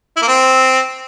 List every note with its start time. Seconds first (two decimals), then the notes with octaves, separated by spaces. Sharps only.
0.16 E4
0.22 A#3
0.28 C4